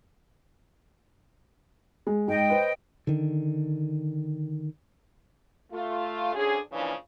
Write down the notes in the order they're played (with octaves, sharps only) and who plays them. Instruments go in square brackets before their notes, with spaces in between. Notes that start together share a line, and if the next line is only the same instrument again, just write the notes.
[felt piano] G#3
[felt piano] G#2 [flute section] D#5 G5
[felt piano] B4 C5
[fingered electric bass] D3 D#3
[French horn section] A3 F4
D2 C#4 D4 G#4
C#3 E3 F3 A#3 C#4 D4